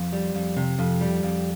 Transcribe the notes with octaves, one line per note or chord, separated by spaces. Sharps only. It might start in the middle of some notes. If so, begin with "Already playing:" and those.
Already playing: F2
G3
F2
C3
F2
G3
F2